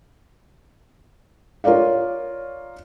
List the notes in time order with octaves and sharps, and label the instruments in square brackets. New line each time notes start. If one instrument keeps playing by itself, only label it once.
[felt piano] F4 A#4 C#5 D5 F5